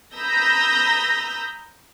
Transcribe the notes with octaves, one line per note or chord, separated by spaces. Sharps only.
A#5 B5 D#6 E6 G6 A#6